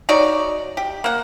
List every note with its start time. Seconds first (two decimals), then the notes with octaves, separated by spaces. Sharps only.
0.09 D#4 F#4 C#5 D5
0.77 G4
1.04 A#3 F#5